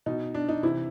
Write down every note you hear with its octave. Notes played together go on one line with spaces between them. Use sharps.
B2 D#4
D4
D#4
C3 E3 E4